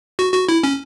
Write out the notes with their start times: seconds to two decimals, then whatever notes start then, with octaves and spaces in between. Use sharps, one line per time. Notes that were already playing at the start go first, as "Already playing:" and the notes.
0.19 F#4
0.34 F#4
0.49 E4
0.63 C#4